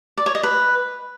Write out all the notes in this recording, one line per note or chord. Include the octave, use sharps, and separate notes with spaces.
D5
C#5
D#5
B4